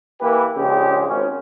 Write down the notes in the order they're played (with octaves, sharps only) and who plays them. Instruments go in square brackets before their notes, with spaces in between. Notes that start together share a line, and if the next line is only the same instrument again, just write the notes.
[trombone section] E3 A#3 G4 B4
A#1 C#3 G#3 G4
G#1 C#4